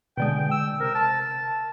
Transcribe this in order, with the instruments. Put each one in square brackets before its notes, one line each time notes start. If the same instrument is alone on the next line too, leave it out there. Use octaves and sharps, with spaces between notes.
[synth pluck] B2 D3 G#3 [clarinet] G5
[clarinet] E6
[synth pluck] C3 [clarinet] A#4
[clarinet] A5